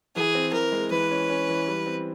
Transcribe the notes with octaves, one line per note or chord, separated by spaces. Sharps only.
E3 G#4
C4
E3 A#4
G#3
E3 B4
C#4
C#4
E3
G3
C4